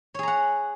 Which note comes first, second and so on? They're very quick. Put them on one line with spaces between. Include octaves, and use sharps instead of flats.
C#5 G#4 A#5 F#5